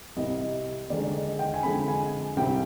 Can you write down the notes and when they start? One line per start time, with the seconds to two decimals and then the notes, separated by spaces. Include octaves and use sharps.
0.16 C2 C3 G3 D#5
0.90 D#2 D3 G#3 D5
1.14 D#5
1.39 G5
1.54 G#5
1.63 F2 D3 G#3 B5
1.88 G#5
2.37 C2 C3 G3 G5